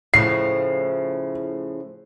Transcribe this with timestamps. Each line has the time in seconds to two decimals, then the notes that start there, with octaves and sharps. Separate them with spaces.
0.14 A2 C#3 F3 C7